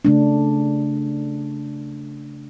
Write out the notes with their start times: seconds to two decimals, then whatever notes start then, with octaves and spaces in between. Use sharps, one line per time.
0.05 C#3 A3 D4